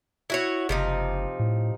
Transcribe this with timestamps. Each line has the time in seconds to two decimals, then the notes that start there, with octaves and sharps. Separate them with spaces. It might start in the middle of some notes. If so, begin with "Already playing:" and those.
0.30 E4 F#4 C#5
0.69 F#1 C3 F3 D#4
1.39 A2